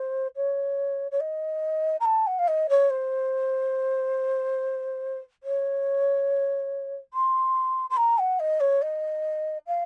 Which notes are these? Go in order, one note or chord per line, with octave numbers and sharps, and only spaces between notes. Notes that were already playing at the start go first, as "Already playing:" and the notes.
Already playing: C5
C#5
C#5
D#5
A#5
A5
F#5
F5
D#5
C#5
C5
C#5
C6
C6
A#5
F#5
D#5
C#5
D#5
F5